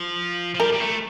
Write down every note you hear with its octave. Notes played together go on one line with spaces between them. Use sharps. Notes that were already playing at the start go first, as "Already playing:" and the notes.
Already playing: F3
F3
G3 A#4
G3
A3